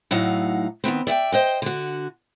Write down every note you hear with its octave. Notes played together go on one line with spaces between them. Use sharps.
A2 F#3 D#4 F5 F#5
D#3 E3 B3 C4
D5 E5 F#5 G5
C5 D#5 G5
D3 F#4